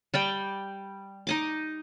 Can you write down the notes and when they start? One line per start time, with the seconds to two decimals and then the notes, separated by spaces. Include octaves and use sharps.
0.14 G3 D5 G5
1.27 D#4 D#5 D6